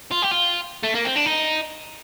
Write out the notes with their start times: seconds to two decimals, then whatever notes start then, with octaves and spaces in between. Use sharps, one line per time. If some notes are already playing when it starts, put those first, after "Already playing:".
0.12 F4
0.22 G4
0.31 F4
0.83 A3
0.95 A#3
1.05 C4
1.16 D4
1.26 D#4